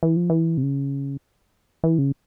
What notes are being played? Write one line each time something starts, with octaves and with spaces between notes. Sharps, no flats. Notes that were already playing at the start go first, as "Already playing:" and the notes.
E3
F3
E3
C3
C#3
E3
C#3